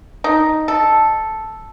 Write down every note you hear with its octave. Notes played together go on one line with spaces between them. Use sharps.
D#4
A4